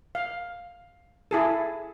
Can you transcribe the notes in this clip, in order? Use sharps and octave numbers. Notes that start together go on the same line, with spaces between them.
F5
E4 G#4 A4